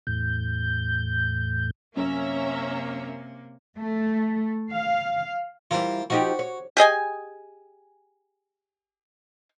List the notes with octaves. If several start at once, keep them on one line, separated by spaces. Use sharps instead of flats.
E2 A2 G6
F#2 C3 A#3 C#4 E5 A#5
A3
F5
E3 G3 F4 A#4 C5
F3 D#4 F#4 G4
C#5
G4 G#4 D#5 G#5